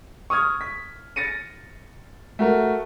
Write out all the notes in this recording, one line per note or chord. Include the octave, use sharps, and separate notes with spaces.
C#6 D#6 F6 G#6
B6
A6 A#6 C#7 D#7
A3 F#4 A#4